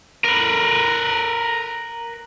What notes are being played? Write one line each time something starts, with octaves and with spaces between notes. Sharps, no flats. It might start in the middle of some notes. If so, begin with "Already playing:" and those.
A#4 B4